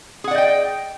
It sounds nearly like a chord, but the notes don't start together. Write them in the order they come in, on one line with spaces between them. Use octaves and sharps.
G#4 F#5 D5 D#5 G5